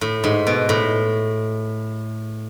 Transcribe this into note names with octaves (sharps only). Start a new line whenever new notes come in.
A2
G#2
B2
A2